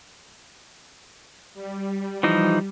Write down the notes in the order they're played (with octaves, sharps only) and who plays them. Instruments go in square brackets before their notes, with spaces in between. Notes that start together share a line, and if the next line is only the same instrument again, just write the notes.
[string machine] G3
[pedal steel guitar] E3 F3 D#4